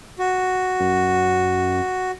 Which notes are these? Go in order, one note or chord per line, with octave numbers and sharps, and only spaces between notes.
F#4
F#2